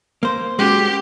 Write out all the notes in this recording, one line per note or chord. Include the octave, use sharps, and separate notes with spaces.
A#3 C5
G#3 C#4 F#4 G4